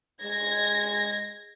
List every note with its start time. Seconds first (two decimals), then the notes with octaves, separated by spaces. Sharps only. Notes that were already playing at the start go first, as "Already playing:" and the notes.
0.24 G#3 G#6 A#6